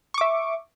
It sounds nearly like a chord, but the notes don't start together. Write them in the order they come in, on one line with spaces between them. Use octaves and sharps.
C#6 D6 E5